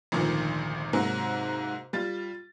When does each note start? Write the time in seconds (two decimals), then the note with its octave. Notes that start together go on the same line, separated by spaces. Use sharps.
0.12 G#1 D2 A#2 D#3 F3
0.93 G#2 C3 F#3 A#3
1.93 G3 F4 A6